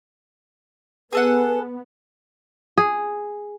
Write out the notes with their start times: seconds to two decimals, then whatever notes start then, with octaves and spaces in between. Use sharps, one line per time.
1.13 B3 G#4 A4 B4 F#5
2.78 G#4